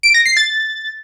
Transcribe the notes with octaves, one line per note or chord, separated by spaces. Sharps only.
D7
A#6
C7
A6